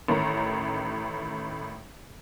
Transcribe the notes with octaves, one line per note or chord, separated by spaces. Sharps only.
A1 A2 D#3 A#5